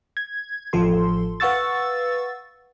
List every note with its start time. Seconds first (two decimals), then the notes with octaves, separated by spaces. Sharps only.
0.17 G#6
0.73 A1 F3 A4 C6
1.40 B4 F5 F#5 C#6 E6 A6